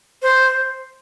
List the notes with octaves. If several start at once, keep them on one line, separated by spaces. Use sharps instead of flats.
C5